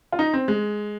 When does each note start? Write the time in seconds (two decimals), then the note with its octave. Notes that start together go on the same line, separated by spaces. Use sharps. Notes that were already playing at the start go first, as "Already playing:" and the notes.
0.13 F4
0.19 D#4
0.34 C4
0.48 G#3